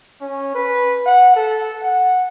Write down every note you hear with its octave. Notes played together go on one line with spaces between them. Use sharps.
C#4
B4
F#5
A4
F#5